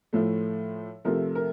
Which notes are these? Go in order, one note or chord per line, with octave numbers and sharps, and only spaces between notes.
A2 F3 A3
C3 F3 A3 A#4
A#4